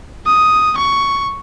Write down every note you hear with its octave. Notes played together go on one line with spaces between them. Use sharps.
D#6
C#6